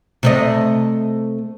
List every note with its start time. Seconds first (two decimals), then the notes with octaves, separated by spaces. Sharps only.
0.23 C3 A3 D#5